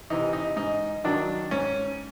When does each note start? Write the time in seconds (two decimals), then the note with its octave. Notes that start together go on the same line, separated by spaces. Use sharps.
0.10 C3 E3 D#4
0.33 D#4
0.56 G#2 D#4
1.04 D#3 F#3 D4
1.51 G#2 C#4